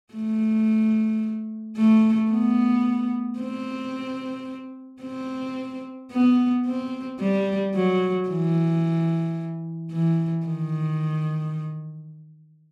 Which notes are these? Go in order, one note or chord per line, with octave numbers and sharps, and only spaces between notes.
A3
A3
B3
C4
C4
B3
C4
G3
F#3
E3
E3
D#3